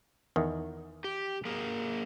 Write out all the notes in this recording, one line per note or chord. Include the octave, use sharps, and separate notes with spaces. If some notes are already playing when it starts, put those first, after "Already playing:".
E2 D#3
G4
A#3 G#4 A#4